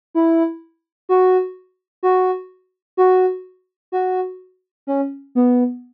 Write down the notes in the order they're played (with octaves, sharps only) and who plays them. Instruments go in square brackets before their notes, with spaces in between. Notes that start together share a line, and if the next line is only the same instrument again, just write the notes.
[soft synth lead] E4
F#4
F#4
F#4
F#4
C#4
B3